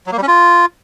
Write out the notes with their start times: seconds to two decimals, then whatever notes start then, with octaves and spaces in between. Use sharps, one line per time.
0.07 F#3
0.12 A#3
0.17 G3
0.22 C#4
0.28 F4